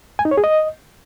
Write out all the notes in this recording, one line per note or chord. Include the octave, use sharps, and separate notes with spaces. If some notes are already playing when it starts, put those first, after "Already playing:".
G#5
D#4
C#5
G#4
D#5